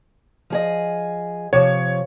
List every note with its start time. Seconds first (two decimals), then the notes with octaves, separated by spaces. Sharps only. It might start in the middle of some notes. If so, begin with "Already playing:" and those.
0.50 F3 G#4 D#5
1.53 C3 F3 C#5